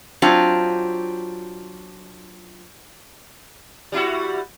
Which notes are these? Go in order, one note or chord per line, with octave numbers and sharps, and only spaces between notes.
F#3 C4 D4 F4 G4
G3 E4 F#4